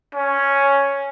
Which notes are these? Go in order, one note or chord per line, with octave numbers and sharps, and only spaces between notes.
C#4